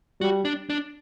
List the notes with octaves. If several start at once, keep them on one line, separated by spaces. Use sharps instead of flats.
G3 F#4
D4
D4